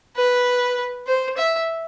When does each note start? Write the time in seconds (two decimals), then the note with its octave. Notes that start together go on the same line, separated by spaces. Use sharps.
0.16 B4
1.07 C5
1.37 E5